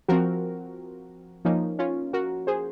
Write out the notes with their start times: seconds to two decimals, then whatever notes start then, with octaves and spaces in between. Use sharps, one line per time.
0.08 F3 C4 F#4 A#4
1.45 F3 A#3 C#4 D#4
1.79 C#4 F4
2.13 F#4 A#4
2.47 G#4 C5